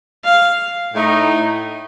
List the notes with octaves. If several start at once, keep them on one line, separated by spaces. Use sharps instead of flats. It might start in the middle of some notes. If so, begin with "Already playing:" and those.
F5
A2 A3 D#4